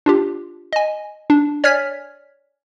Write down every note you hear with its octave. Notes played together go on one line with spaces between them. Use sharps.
D4 F4 G4
D#5 G#5
D4
C#5 D5 G#5 F6 G#6 B6